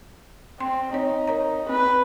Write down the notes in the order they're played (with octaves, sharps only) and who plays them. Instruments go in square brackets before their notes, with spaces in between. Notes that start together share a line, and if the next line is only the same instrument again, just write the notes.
[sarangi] C4 [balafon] C6
[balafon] C4 C#5 [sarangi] D#4
[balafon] A#4 C#5 A#5
[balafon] C4 [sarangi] B4